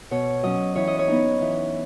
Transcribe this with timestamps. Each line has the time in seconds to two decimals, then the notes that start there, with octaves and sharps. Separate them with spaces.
0.11 B2 C#5
0.43 F#3 C#4 D#5
0.76 E3 C#5
0.88 D#5
0.99 C#5
1.08 B3 D#4
1.41 E3